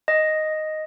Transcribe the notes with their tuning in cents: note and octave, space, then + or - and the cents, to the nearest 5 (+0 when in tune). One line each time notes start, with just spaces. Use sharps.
D#5 +0